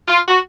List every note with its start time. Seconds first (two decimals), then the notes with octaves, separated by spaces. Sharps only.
0.08 F4
0.27 F#4